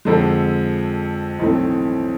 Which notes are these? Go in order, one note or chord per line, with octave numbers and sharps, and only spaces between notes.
F2 D3 G#3
B1 A2 E3 A3 C4